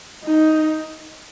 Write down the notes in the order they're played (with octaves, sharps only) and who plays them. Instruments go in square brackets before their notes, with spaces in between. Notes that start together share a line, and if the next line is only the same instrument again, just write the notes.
[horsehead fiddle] D#4